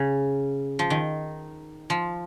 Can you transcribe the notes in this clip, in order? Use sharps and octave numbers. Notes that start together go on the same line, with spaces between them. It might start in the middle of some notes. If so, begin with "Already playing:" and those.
Already playing: C#3
F3
D#3
F3